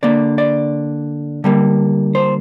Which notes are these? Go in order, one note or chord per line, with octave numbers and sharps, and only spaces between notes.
D3 A#3 D5
D5
D3 G3 A#3
C5